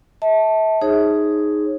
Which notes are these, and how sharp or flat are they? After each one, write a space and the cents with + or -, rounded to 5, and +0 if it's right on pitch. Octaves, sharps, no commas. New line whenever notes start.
E5 -35 A5 +0
D#4 +0 G#4 +0 C#5 -30